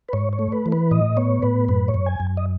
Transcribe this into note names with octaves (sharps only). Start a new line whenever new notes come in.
B4
G#2 C#5
C#5
A3
B4
E3
B4
A2 D#5
B3 C#5
A2 B4
F#2 B4
C#5
F#2
G#5
F#2
D#5